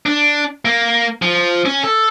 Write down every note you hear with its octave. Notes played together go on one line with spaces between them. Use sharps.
D4
A#3
F3
C#4
A4